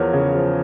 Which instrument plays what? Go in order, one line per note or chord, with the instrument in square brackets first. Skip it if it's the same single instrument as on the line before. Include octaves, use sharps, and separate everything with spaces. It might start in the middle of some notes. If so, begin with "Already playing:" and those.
Already playing: [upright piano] E2 F3 A#4 C#5
C#3
F3